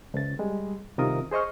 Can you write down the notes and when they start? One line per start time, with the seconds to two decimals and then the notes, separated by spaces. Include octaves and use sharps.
0.14 C#2 A6
0.39 G3 G#3
0.98 C2 C3 D#3 F4 A#4 D#6
1.31 G#4 C5 D#5 C#6 F6